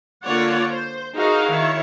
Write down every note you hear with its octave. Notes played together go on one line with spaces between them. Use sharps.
D3 A#3 F4 C#5 D5 F#5
C5
D#4 F#4 G#4 A#4 F5
D#3 E4 C#5